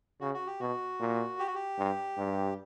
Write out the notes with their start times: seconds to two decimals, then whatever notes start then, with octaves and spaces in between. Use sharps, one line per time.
0.21 C#3 F#4
0.34 F#4
0.47 G4
0.60 B2 F#4
1.00 A#2
1.39 G4
1.47 F#4
1.55 G4
1.78 G2
2.18 G2